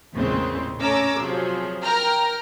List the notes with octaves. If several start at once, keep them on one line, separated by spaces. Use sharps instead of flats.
A1 E2 A#2 C#3 G#3 C4
A3 C#4 A#5 D6 E6
C3 F3 F#3 G#4
A#4 G5 A#5 F6